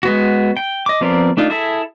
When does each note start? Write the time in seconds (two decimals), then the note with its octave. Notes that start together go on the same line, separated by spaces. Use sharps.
0.03 G#3 B3 F#4
0.57 G5
0.86 D#5 D6
1.01 F3 B3 C4 A#4 D5
1.37 A3 D4 D#4 F4
1.50 E4 G#4 A4 E5